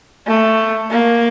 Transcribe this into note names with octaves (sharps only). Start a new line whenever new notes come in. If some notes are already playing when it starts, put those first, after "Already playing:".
A3
A#3